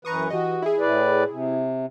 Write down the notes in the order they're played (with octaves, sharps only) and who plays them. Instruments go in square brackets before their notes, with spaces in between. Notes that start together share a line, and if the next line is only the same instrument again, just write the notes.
[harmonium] F#2 E3 B4 [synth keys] A#5 C#6 D#6
[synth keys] E3 G4 D#5 [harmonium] F#4
[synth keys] E4 G#4
[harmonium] A2 B4 D5
C3